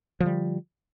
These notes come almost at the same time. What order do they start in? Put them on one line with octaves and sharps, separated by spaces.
F3 D3 G3